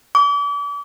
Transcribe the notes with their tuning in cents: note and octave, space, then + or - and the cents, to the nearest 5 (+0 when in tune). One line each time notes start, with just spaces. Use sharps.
D6 -40